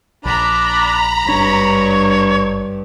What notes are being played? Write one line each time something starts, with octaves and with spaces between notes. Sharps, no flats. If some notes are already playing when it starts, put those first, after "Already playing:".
A#1 D4 A#5 B5
G#1 G2 D4 C#5